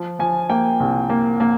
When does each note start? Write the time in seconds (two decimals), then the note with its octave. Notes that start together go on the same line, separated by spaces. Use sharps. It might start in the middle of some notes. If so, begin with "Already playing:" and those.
Already playing: F3
0.19 F3 G#5
0.50 A#3 G5
0.80 C2
1.09 A#3
1.40 A#3